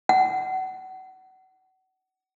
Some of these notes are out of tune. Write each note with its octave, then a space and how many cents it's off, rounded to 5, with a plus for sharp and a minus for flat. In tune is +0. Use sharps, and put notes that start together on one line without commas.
F#5 +30